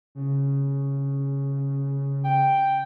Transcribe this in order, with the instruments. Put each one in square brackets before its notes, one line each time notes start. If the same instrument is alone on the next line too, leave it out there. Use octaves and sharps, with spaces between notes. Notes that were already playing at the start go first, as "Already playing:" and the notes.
[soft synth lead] C#3
[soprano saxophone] G5